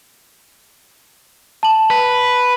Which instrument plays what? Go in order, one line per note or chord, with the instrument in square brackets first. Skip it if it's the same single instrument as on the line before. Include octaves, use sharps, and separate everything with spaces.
[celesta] A5 F#7
[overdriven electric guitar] B4